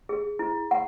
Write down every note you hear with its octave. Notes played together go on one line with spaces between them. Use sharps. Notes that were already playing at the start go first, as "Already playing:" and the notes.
G#4
E4
F#5